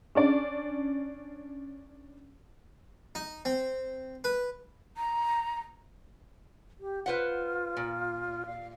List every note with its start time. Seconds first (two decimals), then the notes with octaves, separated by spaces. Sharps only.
0.15 C#4 D4 D5
3.15 D#4
3.45 C4
4.24 B4
4.97 A#5
6.80 G4
7.06 F4 B4 C5 F#5
7.77 A#2
8.46 F5